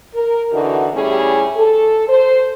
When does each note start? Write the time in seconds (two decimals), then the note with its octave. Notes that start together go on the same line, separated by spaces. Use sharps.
0.14 A#4
0.52 D3 E3 D#4 F#4
0.93 A2 G3 C#4 E4 G4 G#4
1.56 A4
2.08 C5